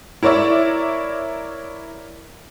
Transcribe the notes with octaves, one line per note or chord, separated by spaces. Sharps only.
E4 A#4 C#5 D5 E5